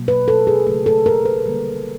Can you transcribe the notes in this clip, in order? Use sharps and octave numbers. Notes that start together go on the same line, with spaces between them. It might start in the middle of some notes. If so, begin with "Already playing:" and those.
Already playing: B2 F#3 A#3
B4
A4
G#4
C#3 F#3 A3 G#4
A4
A#4
B4
D3 G3 A#3